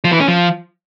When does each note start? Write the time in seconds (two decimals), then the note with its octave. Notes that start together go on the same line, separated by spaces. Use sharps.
0.04 F3
0.12 E3
0.20 C#4
0.28 F3